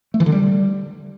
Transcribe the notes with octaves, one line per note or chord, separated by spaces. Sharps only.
A3
E3
D3
G3